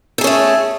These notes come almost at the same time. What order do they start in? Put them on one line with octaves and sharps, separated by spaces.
A4 G#4 C#4 A3